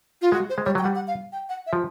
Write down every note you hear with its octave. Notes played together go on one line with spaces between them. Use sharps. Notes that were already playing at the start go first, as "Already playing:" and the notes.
F4
G#3 F#4
C5
G#3
G3 C#5
F#3 G5
F#5
G3
F#5
F5
G5
F#5
E5
F3